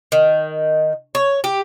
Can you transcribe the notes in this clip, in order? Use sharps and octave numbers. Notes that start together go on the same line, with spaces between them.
D#3
C#5
G4